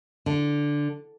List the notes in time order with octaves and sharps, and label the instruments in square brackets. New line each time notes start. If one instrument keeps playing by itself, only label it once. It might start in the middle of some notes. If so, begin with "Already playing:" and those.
[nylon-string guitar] D3